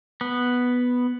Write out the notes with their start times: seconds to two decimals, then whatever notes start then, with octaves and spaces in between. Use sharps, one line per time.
0.21 B3